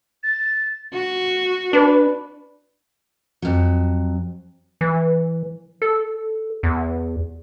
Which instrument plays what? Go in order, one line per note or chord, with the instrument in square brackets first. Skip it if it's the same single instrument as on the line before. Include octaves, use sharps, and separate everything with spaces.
[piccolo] A6
[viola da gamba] F#4
[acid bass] D4 [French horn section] B4
[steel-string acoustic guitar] F2 F#3
[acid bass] E3
A4
E2